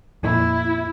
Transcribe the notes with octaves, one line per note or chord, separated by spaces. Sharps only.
F2 A#2 E4